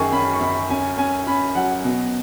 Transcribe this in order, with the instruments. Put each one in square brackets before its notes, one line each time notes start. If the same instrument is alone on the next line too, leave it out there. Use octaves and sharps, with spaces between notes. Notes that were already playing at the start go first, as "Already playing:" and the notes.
Already playing: [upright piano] F#2 D#3 G#4 G#5 C#6
C#4 B5
C#6
F#2 B5
C#4 G#5
C#4 G#5
C#4 B5
F#3 F#5
B2